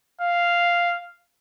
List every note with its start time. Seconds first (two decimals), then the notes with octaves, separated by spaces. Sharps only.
0.21 F5